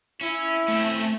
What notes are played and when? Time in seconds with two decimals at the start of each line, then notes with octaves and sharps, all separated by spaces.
0.21 C#4 E4
0.68 A3 C4 C#4